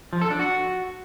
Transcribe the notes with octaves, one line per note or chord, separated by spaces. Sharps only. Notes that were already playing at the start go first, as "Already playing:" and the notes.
F3
A4
D4
F#4